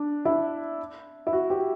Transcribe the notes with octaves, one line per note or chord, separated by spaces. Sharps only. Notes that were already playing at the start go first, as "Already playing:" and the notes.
Already playing: D4
E4
E4
F#4
G4